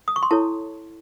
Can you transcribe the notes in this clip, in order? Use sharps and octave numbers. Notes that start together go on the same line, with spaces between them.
D#6
C#6
C6
E4 A4 C#5 A5